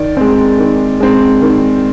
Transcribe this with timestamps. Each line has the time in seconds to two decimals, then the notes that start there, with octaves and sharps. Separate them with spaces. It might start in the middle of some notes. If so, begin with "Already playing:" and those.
Already playing: D#3 D5
0.17 G#3 C4
0.59 D#3
1.00 G#3 C4
1.42 D#3